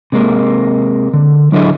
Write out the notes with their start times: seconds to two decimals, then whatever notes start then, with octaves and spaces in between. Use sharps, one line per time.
0.12 C3 G#3 A#3
1.14 D3
1.52 F#3 D4 E4 G#4 A4 D#5